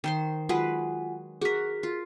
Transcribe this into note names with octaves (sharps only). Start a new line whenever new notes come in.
D#3 C5 C6
F#3 G#3 F4 B4 F#5 G#5
F#4 G#4 A#4 B6
F4